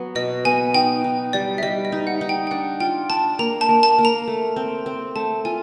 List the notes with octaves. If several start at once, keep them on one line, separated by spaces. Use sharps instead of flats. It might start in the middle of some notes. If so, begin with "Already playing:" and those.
Already playing: F#3 B3
B2 D#5
B3 G#5
D#4 G5
D#4
G3 D5
E5
G3 D#5
D#5
D#4
F#5
D#4
G5
G5
D4 F#5
F4 G5
D4 A5
A#3 A#5
A5
A#3
A5
A#3
A#5
A3
C4
C4
A3 A5
F4 G#5